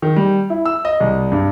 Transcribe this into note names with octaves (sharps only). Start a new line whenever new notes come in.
D#3
G3
E4
E6
D#5
C2
G2